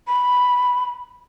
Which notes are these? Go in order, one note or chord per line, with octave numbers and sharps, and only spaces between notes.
B5